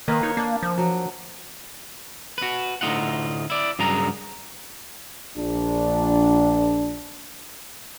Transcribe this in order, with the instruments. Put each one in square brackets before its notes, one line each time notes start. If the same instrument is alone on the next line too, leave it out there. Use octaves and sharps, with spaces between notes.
[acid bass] D#3 [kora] A#3 B4 D#5
[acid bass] D#4 [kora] C#5
[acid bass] A#3 [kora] D4
[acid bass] F3
[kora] F#3
[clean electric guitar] F#4 B4
D2 A2 D4 D#4 F4 F#5
E4 D5
G2 C#3 F#3 G#4 A#4 A#5
[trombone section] A#1 D4